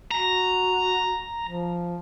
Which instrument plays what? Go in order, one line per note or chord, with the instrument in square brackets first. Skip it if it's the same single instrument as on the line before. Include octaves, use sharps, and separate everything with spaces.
[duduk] F#4 [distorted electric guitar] A#5
[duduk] F3